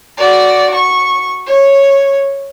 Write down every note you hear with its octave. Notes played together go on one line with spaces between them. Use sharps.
F#4 D5
C#6
C#5